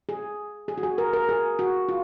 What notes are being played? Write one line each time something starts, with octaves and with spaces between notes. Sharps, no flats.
G#4
G#4
F#4
G#4
A#4
A#4
G#4
F#4
F4